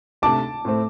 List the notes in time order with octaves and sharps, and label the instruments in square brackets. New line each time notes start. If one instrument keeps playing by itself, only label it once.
[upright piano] C3 A3 D4 [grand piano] A5 D6
[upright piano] A2 A3 C4